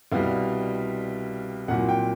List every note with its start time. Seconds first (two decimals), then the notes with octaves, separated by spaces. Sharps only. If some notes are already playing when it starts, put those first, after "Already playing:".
0.12 C2 B2 G3 F5
1.68 C2 A#2 F#3 F#5
1.89 G5